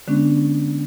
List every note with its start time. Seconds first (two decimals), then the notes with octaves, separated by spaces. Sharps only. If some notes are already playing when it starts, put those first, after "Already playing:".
0.08 D3 G#3 B3 C#4 D4